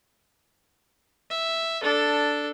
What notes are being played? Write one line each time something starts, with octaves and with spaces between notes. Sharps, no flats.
E5
D4 A4